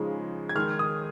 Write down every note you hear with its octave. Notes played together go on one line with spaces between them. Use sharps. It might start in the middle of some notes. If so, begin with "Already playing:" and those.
Already playing: C#3 F3 G#3 D#4
G#6
D#3 G#3 D#4 F6
D#6